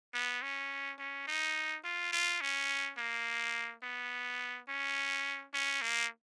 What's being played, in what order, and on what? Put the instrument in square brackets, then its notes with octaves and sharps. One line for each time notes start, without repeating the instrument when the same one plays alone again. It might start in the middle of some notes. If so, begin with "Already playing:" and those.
[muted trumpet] B3
C#4
C#4
D#4
F4
F4
C#4
A#3
B3
C#4
C#4
A#3